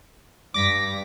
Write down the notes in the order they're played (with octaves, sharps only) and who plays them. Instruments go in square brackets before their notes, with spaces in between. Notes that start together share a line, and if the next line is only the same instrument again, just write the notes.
[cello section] G2 [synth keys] D6 A#6 B6